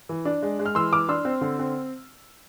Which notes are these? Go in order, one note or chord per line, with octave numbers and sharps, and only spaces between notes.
E3
D4
G#3
G#3
F6
E3 C6 E6
E3 D6 F6
D4 C6 E6
C4
D3
C4